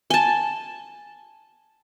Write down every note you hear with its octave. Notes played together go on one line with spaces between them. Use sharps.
G#5 A5